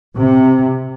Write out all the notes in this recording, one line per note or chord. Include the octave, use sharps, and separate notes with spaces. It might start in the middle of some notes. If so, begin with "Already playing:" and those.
C3